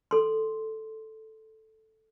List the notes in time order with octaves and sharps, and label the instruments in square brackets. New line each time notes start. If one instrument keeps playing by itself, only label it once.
[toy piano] A4 C6